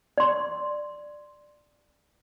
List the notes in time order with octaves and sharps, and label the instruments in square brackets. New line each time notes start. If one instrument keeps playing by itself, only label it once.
[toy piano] D5 C6